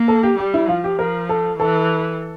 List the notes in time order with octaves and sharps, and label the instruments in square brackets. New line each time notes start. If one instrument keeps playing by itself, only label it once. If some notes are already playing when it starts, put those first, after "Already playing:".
Already playing: [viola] A#3
[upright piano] A4
G4
[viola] G3 [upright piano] G4
[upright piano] E4
[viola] F3 [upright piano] F4
[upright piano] G4
[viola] F3 [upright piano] A#4
[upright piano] A4
[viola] E3 [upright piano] A4